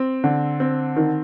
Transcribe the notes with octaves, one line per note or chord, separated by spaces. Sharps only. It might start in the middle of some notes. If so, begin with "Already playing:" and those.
Already playing: C4
D3
C4
D#3